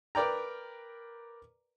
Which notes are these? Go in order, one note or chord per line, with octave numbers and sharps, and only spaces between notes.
A#4 B4 D5 G5 A#5